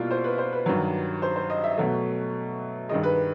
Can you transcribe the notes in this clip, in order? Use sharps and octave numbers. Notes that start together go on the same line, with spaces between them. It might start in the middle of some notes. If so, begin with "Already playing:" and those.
Already playing: B2 G3 A#3 E4 F4
C5
B4
C5
B4
G2 D#3 F#3
C5
C5
D#5
E5
B2 F#3 A3 E5
G2 D#3 G#3 D#5
B4